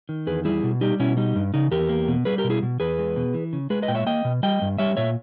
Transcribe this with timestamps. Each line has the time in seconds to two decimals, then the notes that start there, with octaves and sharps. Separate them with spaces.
0.09 D#3
0.27 E2 G#4 B4
0.45 G3 E4 G#4
0.63 B2
0.81 G3 D#4 G4
0.99 B2 C#4 E4
1.17 G3 D#4
1.36 G2
1.54 C#3 D#4
1.71 E2 G4 A#4
1.89 A#3
2.08 B2
2.25 G3 G#4 B4
2.38 G4 A#4
2.44 B2
2.50 E4 G#4
2.63 B2
2.80 E2 G#4 B4
2.98 G#3
3.16 B2
3.34 E3
3.53 C#3
3.70 G#3 G#4 B4
3.82 B4 D#5
3.88 A#2 G5
3.95 C#5 E5
4.06 A#3 D#5 G5
4.25 B2
4.43 G3 D#5 G5
4.62 G2
4.78 G3 C#5 E5
4.97 A#2 C#5 E5